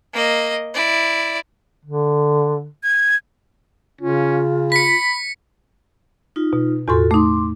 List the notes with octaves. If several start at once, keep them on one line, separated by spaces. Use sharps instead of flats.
A#3 D#5
E4 D5
D3
G#6
C#3 C#4 F4
B5 B6 C#7
D#4 F4
B2
E2 A2 F4 F#4 A4 C6
A3 D#4 C6 D6